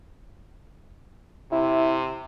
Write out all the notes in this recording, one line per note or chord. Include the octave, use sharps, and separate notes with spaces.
C3 E4